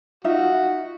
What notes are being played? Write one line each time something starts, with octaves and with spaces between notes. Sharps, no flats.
D#4 F4 F#4 E5